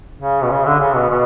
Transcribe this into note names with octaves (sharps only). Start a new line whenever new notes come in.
C#3
B2
C#3
D3
C#3
B2
B2